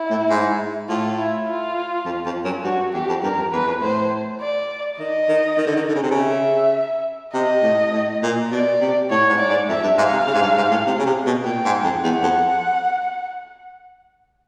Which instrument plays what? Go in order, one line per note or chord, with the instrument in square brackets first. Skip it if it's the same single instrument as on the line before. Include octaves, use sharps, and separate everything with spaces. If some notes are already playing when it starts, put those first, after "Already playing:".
Already playing: [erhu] E4
[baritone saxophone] A2
G#2
[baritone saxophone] A2 [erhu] F4
[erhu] E4
F4
[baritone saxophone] F2
F2
F#2
[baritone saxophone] G2 [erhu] F#4
[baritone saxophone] E2 [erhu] G4
[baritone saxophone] F2
[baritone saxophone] G2 [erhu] A#4
[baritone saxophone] F2
[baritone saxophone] E2 [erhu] B4
[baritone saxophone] F2
[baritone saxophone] A2 [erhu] C5
[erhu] D5
[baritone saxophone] D#3 [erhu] D#5
[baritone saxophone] D#3
D#3
D3
D#3
D3
C#3
C3
C#3
[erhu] E5
[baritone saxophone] C3 [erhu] D#5
[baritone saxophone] A2
A2
A#2
[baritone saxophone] B2 [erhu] D5
[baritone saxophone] C3
[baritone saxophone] A2 [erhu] C#5
[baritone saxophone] G#2
[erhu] D5
[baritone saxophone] G#2
[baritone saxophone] F2 [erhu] E5
[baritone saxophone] G2
[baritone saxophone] G#2 [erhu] F5
[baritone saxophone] C3
C#3
G#2
G2
G#2
A2
C3
C#3
C3
B2
[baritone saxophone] A#2 [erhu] G5
[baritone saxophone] G#2
F2
[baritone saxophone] E2 [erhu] F#5
[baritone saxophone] F2